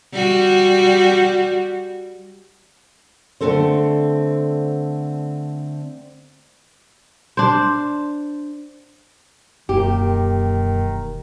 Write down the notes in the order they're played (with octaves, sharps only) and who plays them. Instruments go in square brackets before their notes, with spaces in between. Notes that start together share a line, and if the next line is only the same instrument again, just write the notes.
[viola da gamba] G3 F#4
[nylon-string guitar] D3 A3 C4 A4 C5
[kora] D4 C5
[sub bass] E1 [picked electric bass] F#2 A#3 [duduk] D#3 [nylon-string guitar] G4